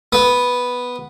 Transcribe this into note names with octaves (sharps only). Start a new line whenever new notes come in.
B3